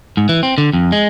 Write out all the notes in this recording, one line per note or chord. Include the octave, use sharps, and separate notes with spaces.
G#2
E3
C4
D3
F2
G#3